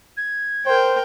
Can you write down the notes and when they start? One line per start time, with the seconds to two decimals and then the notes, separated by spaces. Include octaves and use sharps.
0.17 G#6
0.66 A#4 C5 G5